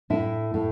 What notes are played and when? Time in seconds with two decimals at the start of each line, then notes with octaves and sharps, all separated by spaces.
0.10 A2 E4
0.54 A2